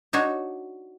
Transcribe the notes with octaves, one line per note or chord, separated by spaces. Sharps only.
D4 D#4 F#4 C#5